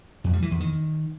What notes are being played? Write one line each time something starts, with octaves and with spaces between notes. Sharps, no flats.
F2
G3
E3
E2
D#3